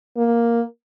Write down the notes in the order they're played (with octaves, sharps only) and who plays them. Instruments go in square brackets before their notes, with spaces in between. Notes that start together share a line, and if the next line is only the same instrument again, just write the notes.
[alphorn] A#3